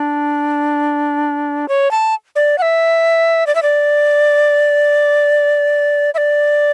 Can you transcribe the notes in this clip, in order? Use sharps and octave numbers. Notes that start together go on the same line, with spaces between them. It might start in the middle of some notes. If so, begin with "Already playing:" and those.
Already playing: D4
C#5
A5
D5
F#5
E5
D5
E5
D5
E5
D5